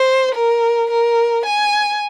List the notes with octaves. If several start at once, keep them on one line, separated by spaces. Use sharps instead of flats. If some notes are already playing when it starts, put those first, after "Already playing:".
Already playing: C5
A#4
A#4
G#5